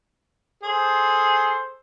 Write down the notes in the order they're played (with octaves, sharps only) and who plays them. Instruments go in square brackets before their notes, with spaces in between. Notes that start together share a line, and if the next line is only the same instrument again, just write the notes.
[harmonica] G#4 [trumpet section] A4 C5